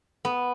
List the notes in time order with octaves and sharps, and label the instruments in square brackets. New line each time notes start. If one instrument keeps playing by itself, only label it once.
[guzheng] B3